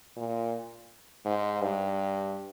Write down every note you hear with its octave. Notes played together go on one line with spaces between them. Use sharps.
A#2
G#2
G2